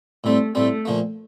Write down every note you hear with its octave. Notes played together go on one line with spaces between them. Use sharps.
A2 G3 A3 C4
A2 G3 A3 C4
A#2 F3 A3